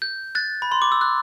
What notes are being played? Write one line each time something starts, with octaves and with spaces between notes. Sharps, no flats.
G6
F#6 A6
B5
C6
D6
E6
F#6